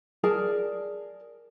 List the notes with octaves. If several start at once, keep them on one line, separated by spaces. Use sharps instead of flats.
G#4 A#4 D5 A5